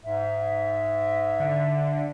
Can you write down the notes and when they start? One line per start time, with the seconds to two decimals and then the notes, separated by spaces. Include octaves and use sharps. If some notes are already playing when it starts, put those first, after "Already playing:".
0.04 G#2 E5
1.40 D3